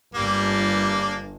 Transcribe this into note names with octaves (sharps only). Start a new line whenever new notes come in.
G1 G3 A#3 D4